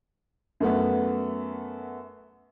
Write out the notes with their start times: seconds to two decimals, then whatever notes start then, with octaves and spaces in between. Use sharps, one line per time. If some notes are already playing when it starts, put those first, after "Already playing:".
0.60 F#2 A3 B3